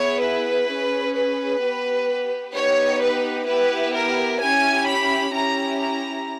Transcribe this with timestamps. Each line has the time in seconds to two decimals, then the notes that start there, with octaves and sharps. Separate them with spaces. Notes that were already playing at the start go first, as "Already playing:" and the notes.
Already playing: B3 E4 G#4 C#5
0.22 B4
0.69 C#4 G#4
1.16 B4
1.62 B3 G4
2.55 B3 D#4 G4 C#5
3.01 B4
3.47 B3 E4 G4 B4
3.94 A#4
4.40 C#4 E4 G4 G#5
4.87 B5
5.34 C#4 E4 G4 A#5
5.80 A#5